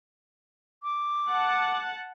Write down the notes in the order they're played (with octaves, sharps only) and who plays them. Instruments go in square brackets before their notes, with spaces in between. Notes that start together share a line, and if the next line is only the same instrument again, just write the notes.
[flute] D6
[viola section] F#5 A5